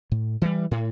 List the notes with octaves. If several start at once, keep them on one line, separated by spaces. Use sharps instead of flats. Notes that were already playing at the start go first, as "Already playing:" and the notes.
A2
E3 G3
A2